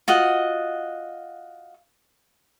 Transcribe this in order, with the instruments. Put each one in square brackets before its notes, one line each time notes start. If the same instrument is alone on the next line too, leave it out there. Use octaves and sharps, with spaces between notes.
[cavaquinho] F4 F#4 D#5 F#5